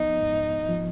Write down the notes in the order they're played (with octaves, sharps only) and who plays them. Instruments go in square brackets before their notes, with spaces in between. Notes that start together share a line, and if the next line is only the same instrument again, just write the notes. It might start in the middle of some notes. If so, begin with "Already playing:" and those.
Already playing: [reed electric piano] F3 B3 [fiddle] D#4
[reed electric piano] G#2
F3